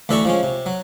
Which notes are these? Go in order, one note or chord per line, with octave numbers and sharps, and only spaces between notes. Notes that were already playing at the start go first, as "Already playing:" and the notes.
D2 E3 A4 D5 A#5 C#6
F3 G#3 C#4
C3
F#3